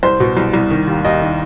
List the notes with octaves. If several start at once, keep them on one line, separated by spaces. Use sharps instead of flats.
C2 C5
B2
C2
C2
D#3
D#2
D#2 D#5
D#3